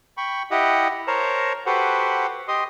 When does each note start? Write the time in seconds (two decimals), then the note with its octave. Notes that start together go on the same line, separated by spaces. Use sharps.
0.17 G5 B5 C#6
0.51 E4 G4 D#5 F#5
1.07 A#4 C5 C#5 A5 A#5
1.66 F#4 G4 A4 B4 C5 F#5
2.48 G4 D#5 C6 D#6